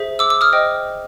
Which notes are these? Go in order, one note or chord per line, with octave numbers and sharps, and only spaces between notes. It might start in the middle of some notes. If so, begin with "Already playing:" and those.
Already playing: G#4 C5 E5
D6 E6
D6 E6
D#6 F6
C5 D#5 G5